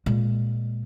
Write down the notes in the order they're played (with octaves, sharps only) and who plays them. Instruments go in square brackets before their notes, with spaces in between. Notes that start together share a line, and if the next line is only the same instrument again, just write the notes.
[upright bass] A#2 G#3